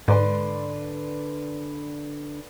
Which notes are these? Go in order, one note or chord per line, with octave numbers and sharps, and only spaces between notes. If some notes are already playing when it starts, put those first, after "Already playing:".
G#2 D3 B4 D5 C6